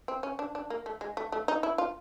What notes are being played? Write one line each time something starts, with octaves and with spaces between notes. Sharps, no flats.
C4
C#4
D4
D4
A#3
A3
G#3
A3
A3
D#4
E4
F4